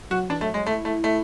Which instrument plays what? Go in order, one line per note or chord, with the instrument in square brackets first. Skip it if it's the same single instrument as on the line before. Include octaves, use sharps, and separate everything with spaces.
[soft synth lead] F#3 [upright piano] F#4
[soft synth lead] E3 [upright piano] D4
[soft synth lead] F#3 [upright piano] A3
[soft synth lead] F#3 [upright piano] G#3
[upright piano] A3 [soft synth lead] E4
[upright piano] A3
A3